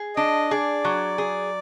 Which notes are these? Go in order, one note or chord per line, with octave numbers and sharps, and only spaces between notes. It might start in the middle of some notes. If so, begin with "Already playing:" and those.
Already playing: G#4
D4 D#5
G#4 D5
F#3
G#4